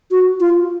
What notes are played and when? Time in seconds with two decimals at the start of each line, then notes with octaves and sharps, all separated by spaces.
0.11 F#4
0.40 F4